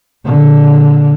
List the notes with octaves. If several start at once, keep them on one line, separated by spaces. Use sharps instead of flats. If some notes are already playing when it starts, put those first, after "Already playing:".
A#2 D3